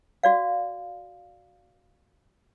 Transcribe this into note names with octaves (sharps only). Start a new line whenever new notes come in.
F#4 D5 F5